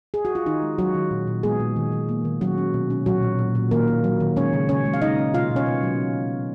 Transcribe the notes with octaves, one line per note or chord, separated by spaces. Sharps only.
G#4
F#4
F4
D#3 D#4
G#3
F#3 C#4 F#4
D#3
A#2
A#2
G#3 B3 G#4
A#2
D#3
D#3
A#3
D#3
F#3 C#4 F#4
C#4
B2
C#4
A#2 F#3 F#4
A#2
A#2
A#2
D#3 A#3 A#4
A#3
F#3
D#3
G#3 C#4 C#5
C#3
C#3 C#4 C#5
G#3
F5
C#4 D#4 D#5
C#4
B2 F4 F5
B2
C#4 C#5
B3
F#3